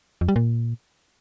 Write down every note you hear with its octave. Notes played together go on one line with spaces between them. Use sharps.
F2
G3
A#2